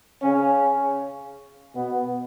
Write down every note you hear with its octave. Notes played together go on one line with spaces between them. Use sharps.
C#3 C#4
B2 B3